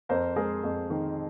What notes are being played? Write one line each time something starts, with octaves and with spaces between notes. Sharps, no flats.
F2 A#4 C5
G#3 G#4 A#4
F2
D#3